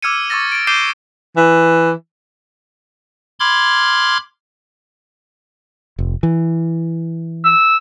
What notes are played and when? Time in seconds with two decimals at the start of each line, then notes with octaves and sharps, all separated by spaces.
0.03 D6 E6 F6 G#6 C#7 D#7
0.30 C#6 D6 E6 A6 A#6
0.52 A6 D7
0.67 D6 G6 C7 D#7 E7 G7
1.37 E3
3.40 B5 C6 D6 F6 G#6
5.99 F1
6.23 E3
7.44 E6